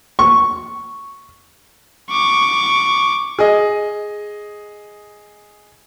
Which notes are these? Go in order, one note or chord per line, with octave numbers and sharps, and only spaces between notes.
C#6
C#6 D6
G#4 D#5